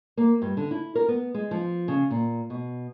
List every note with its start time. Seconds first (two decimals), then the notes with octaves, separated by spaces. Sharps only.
0.17 A#3
0.42 G2
0.57 D3
0.71 E4
0.95 A#4
1.08 B3
1.34 G#3
1.51 F3
1.88 C#3
2.10 A#2
2.50 B2